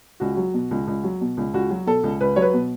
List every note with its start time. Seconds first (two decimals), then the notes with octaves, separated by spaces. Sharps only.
0.20 C#2 F#4
0.37 F#3
0.54 B2
0.71 C#2
0.87 C#2
1.04 F#3
1.21 B2
1.37 C#2
1.54 C#2 F#4
1.71 F#3
1.86 B2 A4
2.03 C#2
2.21 C#2 B4
2.36 F#3 C#5
2.42 B4
2.53 B2